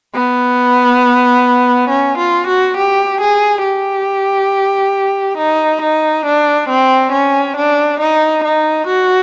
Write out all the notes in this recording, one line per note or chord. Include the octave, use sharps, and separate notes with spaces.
B3
C#4
F4
F#4
G4
G#4
G4
D#4
D#4
D4
C4
C#4
D4
D#4
D#4
F#4